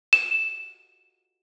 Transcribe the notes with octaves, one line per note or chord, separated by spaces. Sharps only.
E7